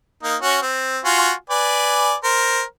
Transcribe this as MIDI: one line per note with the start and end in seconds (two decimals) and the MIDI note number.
0.23 0.36 58
0.23 0.36 63
0.41 0.58 61
0.41 0.58 66
0.62 0.99 60
1.04 1.32 65
1.04 1.32 66
1.04 1.32 80
1.50 2.15 71
1.50 2.15 74
1.50 2.15 80
2.24 2.63 70
2.24 2.63 72